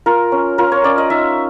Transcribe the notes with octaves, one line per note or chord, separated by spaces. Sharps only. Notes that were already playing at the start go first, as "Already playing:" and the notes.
F4 A#4
C#4
F4 A#4
C#5
C#4 D5
D#5
D#4 E5